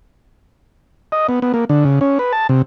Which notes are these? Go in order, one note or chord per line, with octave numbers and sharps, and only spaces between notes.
D#5
B3
B3
A#3
D3
C#3
C#4
B4
A5
C3